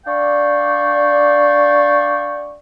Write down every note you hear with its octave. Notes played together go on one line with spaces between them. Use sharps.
D4 D5 F5 G5 C#6